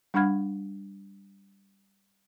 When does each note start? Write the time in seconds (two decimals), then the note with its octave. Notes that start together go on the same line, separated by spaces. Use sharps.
0.14 G3 D4 F#5 B5 F6 G#6